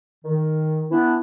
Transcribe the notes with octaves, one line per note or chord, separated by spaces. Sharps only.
D#3
E3 B3 D4 E4